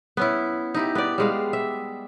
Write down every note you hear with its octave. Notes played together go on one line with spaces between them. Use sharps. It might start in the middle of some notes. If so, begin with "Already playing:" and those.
B3 C#4 E4
D#4 E4 G4
B3 D5
G3 G#3 F5
E5